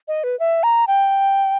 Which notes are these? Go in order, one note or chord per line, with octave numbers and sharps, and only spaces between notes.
D#5
B4
E5
A#5
G5